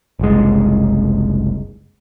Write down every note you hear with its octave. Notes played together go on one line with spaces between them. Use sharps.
F#1 C2 G#3